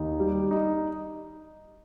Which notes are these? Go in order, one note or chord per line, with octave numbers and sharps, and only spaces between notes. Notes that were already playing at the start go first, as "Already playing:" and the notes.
Already playing: D#2 D#4
G3
D#4